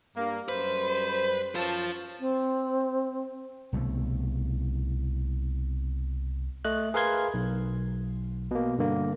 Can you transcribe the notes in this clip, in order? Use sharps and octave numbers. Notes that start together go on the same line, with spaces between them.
G2 G3 A#3
F#2 G3 B4 C5
F#2 F4 C5 C#5 A5
C4
C2 B2 E3 A3
A3 D#5 F#6
G#4 A#4 B4 F5 C6 G#6
B1
B2 A#3
G2 D3 A#3